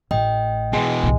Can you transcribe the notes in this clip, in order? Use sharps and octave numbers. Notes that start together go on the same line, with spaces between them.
A1 D#5 G5
B2 E3 G#3
C2 A2